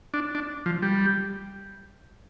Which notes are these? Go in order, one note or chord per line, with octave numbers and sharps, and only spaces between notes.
D4
D4
F3
G3